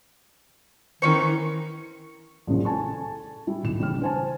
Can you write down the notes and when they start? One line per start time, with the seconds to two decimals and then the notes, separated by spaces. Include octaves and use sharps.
1.02 D#3 E3 C#4 D#4 C5 C#6
2.47 A#1 F#2 C#3 E3 F3
2.65 A4 G#5 A5 C#6
3.47 G3 E4
3.63 D#1 B1 E7
3.79 F#1 E3 G3 C#4 D4 F6
4.02 C5 G#5 A5